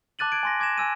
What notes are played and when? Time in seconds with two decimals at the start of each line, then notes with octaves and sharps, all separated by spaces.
0.19 A5 D6 F#6 A6 D#7 F#7
0.32 G#6 D7
0.43 G#5 C6 A#6
0.60 D6 G#6 A#6 E7
0.78 G#5 E6 D#7